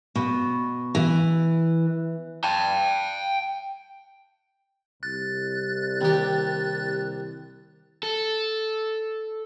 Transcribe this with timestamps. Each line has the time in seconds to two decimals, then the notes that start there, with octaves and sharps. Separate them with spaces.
0.15 B2
0.95 E3
2.44 G5 A5
5.03 C2 F#6 A6
6.01 D#2 G4
8.03 A4